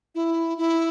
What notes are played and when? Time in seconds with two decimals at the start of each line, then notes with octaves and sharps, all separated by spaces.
0.15 E4
0.58 E4